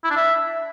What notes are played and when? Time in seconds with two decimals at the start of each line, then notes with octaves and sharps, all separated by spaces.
0.04 E4
0.10 D4
0.16 E5